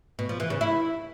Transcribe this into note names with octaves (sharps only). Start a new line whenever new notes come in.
B2
F3
E3
C#3
E4